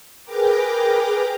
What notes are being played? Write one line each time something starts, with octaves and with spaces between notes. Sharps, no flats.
G#4 A#4 B4 G5 A#5 D6